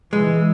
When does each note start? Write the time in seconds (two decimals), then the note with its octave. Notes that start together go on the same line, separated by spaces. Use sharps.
0.12 E3 G#3